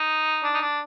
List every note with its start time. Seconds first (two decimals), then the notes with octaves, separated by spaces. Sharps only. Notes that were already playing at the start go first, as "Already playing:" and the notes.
Already playing: D#4
0.43 D4
0.54 D#4
0.61 D4